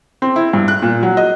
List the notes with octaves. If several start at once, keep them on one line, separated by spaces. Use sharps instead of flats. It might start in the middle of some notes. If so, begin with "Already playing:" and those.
C4
E4
G2
F#6
A#2
F#3
D#5